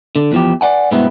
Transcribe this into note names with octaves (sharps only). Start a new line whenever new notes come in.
D3
E2 F3 G4
D5 F#5 G#5
G2 B2 G#3 B3 C4 E4